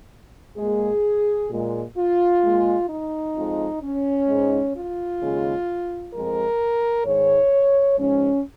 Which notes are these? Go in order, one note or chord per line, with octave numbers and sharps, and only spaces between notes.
A#2 G#3 G#4
A#2 G#3
F4
A#2 G#3
D#4
F2 F3 G#3
C#4
G#2 G#3
F4
D#2 C#3 G#3
F2 F3 G#3 A#4
G#2 D#3 G#3 C#5
G#2 F3 G#3 C#4